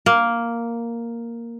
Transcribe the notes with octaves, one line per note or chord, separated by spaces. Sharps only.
A#3